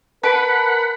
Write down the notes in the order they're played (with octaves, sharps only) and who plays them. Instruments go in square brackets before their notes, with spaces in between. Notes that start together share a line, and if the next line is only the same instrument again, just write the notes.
[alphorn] A#4 [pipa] B4 [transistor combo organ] F#5 B5 [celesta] A5 B6 D7